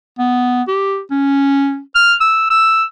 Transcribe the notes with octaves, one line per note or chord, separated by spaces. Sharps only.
B3
G4
C#4
F6
E6
E6